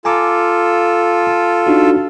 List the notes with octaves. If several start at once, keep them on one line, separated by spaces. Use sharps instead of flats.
F4 A4 G#5 A#5 D6
D4 D#4 F#4